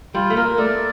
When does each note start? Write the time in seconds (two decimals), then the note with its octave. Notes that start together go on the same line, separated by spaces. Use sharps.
0.15 G3 F4
0.30 A3
0.37 A#3 A#4
0.58 A3 D5